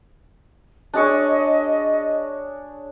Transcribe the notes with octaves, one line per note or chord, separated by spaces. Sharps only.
D4 G#4 C#5 D#5